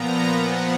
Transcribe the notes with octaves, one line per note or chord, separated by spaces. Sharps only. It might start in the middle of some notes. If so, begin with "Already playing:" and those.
Already playing: A#2 F3 B3 A#5
F#5